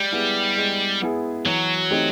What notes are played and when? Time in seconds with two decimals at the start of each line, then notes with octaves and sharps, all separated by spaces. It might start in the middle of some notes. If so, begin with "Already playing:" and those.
Already playing: G3 G#3
0.12 B3 E4 G#4
0.57 G#3
1.01 B3 E4 G#4
1.46 E3 F#3
1.91 A3 C4 D#4 G4